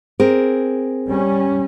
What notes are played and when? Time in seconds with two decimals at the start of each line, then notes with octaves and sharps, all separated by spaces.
0.20 C4 G#4 A#4
1.08 G3 C#4